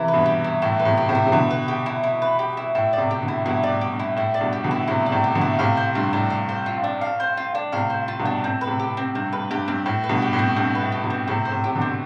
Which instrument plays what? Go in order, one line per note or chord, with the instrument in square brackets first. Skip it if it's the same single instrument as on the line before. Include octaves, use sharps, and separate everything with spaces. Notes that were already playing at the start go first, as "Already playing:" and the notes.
Already playing: [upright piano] C3 E3 [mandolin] E4
[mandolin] B4
[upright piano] G2 B2
[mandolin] G4
E4
[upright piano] A2 [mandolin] E4
[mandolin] B4
[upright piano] A2 C3
[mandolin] G4
[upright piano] A2 C3
[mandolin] E4
[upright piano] C3
[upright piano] B2 D3 [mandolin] E4
[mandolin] B4
G4
E4
E4
B4
G4
E4
[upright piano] A2 [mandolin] E4
[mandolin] D5
[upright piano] A2 C3
[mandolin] G4
[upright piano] B2 D3
[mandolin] E4
[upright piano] G2 B2 [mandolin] E4
[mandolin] D5
[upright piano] A2
[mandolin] G4
[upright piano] G2
[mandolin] E4
[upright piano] A2 [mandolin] E4
[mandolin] D5
[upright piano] G2 B2
[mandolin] G4
[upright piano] B2 D3
[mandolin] E4
[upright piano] A2 C3 [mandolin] E4
[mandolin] D5
[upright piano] A2 C3
[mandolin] G4
[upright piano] B2 D3
[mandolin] E4
[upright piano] A2 C3 [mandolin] F5
[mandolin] C5
[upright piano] G2 [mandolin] F4
[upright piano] A2 [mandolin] D4
[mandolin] F5
C5
F4
D4
F5
C5
F4
D4
[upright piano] A2 C3 [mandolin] F5
[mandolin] C5
F4
[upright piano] G2 B2
[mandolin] D4
[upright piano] A2 [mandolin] C4
[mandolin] B4
[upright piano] A2 C3
[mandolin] G4
C4
[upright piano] G2 [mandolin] C4
[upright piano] G2 [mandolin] B4
[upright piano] G2 [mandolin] G4
[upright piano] G2 [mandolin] C4
[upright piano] A2 [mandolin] C4
[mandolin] B4
[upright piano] G2 B2
[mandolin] G4
[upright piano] A2
[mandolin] C4
[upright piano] G2 [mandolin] C4
[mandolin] B4
[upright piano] A2
[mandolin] G4
[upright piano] G2 B2
[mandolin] C4
[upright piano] A2 C3 [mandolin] C4
[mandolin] C5
[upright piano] A2 C3
[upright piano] C3 [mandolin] G4
[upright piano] B2 D3
[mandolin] C4